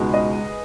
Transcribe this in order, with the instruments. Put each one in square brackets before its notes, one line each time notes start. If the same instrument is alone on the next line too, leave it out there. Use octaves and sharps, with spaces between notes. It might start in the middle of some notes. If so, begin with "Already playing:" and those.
Already playing: [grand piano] C#2 B2 G#3 D#4 [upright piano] G#4 B4
[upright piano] D#5